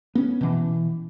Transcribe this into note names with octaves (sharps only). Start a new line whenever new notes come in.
B3 C#4
B2 E3